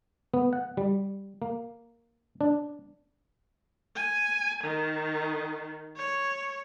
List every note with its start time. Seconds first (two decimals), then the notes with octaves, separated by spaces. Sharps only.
0.34 B3
0.53 F#5
0.77 G3
1.42 A#3
2.41 D4
3.96 G#5
4.64 D#3
5.97 C#5